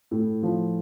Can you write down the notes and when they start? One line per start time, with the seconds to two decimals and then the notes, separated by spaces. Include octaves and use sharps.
0.11 A2
0.43 F3